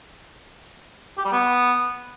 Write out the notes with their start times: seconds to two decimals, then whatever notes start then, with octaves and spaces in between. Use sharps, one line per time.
1.17 G4
1.25 G3
1.32 B3